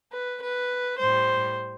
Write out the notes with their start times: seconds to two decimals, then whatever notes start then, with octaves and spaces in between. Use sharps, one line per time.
0.13 B4
0.42 B4
1.00 A2 G3 C5